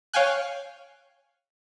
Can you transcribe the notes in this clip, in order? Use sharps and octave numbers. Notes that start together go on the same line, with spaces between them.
C#5 F5 G5 G#5 F#6